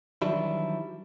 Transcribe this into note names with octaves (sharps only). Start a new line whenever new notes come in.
D#3 E3 F#3 G3 D4 E4